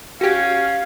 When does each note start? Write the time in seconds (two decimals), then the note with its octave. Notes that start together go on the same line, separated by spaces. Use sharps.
0.21 C#4 F#4 G4 F5